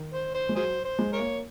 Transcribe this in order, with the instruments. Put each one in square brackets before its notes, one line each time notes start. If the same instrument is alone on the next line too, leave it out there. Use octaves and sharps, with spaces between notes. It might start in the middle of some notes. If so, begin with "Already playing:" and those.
Already playing: [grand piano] D#3
[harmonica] C5
C5
[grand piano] G#3
[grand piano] F#3 [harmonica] G#4 C5
[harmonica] C5
[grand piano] G#3
[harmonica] A#4 C#5
[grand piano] A#3